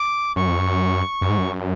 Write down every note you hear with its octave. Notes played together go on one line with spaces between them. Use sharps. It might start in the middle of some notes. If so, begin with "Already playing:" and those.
Already playing: D6
F#2 C#6
F2
F#2
F#2
G#2
F#2